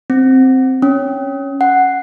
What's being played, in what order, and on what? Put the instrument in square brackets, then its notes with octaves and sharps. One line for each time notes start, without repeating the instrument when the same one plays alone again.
[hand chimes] C4
C#4
F#5